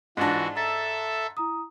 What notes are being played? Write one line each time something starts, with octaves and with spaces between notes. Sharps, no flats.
G#2 E3 D4 F4 F#4 A6 A#6
A4 E5 A#5 E6 A6
E4 A#5 D#6